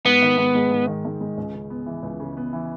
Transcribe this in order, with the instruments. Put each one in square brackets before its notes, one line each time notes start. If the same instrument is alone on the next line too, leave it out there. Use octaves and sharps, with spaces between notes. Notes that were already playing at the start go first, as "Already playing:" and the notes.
[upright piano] G#2 [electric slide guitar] B3
[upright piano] D#3
G#2
G#3
G#2
D#3
G#2
G#3
C#2
C#3
B3
E3
C#2
C#3
B3
E3